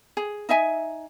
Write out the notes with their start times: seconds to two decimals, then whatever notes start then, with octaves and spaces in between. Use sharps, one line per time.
0.17 G#4
0.49 D#4 D#5 E5 G#5